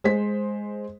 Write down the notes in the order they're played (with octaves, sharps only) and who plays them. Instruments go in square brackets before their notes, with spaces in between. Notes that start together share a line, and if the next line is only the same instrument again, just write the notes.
[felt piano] G#3 C5 B6